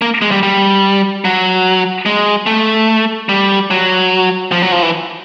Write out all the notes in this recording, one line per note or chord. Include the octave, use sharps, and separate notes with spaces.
A#3
G#3
G3
G3
F#3
G#3
A3
G3
F#3
F3
F#3
F3
E3